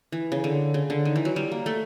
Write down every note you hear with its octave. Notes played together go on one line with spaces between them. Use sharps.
E3
C#3
D3
C#3
D3
D#3
E3
F#3
G3
A#3
A3